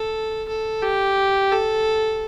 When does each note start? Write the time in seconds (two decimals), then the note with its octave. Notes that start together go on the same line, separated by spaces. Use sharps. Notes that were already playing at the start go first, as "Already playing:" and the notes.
Already playing: A4
0.48 A4
0.82 G4
1.52 A4